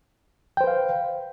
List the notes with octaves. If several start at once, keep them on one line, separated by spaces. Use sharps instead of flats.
B4 C5 F5 G5